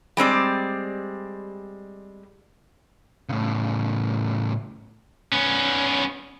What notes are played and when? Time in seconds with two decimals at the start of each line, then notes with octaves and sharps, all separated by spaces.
0.17 G3 G#3 C4 D5
3.29 A2 C#3
5.32 B3 C#4